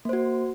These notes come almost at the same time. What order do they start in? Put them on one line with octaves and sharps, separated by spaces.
A#3 C5 F#4